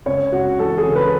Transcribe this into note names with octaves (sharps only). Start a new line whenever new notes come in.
C#2 C#5
C#2 F#4
E3 A4
G#4
C#3
B4